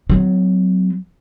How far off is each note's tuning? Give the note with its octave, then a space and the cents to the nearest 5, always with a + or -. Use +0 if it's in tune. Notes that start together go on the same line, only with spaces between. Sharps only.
F#3 +5 C4 -40